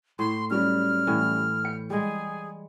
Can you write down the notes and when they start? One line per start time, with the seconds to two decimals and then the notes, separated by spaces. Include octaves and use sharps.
0.19 A2 C6
0.50 F#3 G3 C#4 F6
1.07 A2 E3 F#5
1.64 G5 C#7
1.90 G3 G#3 G#4